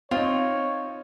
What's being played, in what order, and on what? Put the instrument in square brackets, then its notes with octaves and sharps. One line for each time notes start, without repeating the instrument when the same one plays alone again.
[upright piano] C4 D#4 [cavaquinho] F4 [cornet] C#5